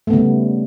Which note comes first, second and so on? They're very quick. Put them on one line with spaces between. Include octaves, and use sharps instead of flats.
A3 B3 C#3 G3